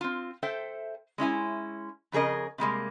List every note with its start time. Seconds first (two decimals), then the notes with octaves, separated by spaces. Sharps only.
0.01 C4 F4
0.43 A4 C5 E5 G5
1.18 G#3 C#4 E4 G#5
2.12 F2 C#3 G#4 A#4 D#5
2.58 C3 G3 G#3 A#3